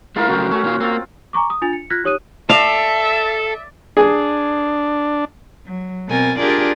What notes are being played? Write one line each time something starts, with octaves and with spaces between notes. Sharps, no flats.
G#3 A3 E4 F4 A#4 F5
C#3 F#3 A3 F#4 G5
A3 C#4 F#4
A#2 D#3 F4
A#3 C4 F4
G#5 A#5 C#6 D6
D#6
D4 F4 G#5 A6 F7
C#7
F4 F6 F#6 G#6 A#6 B6
D#4 G4 C#5 D#6 F#6 D#7
A4 D5 E5 F5
D4 G#4
F#3
B2 C4 A#4 G#5 A6
D4 F4 G4 G#4 A#4 D5